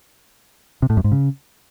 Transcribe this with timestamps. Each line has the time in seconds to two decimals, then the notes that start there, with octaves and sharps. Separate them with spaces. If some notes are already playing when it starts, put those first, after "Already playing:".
0.82 C3
0.90 A2
0.97 F#2
1.04 G#2
1.12 C#3